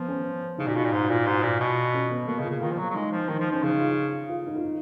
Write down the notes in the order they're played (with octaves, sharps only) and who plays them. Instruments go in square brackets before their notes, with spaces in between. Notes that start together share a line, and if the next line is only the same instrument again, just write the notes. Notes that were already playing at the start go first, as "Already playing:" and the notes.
Already playing: [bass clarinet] F3 [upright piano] B3
[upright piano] C#4
[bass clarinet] C#3 [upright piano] D#4
[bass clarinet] A#2 [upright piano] F#4
[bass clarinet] B2 [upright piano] F4
[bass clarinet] A#2
[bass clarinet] G#2 [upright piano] F#4
[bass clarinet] A#2 [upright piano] F4
[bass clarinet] G#2 [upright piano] F#4
[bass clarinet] A#2 [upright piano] F4
[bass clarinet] B2
[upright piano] C#4
B3
[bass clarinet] B2 [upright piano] A#3
[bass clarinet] C#3
[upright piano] F4
[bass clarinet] C#3
[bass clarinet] D#3 [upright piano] F4
[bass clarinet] F3
F#3
F#3
[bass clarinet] G#3 [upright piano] D#4
[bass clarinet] F3
[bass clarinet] D#3 [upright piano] D#4
[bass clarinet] F3
[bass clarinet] F3 [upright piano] C#4
[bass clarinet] C#3 [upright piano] D#4
[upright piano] F4
F4
D#4
F4
D#4